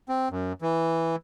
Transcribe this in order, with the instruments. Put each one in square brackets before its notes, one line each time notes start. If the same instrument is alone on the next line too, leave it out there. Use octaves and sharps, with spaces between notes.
[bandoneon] C4
F#2
E3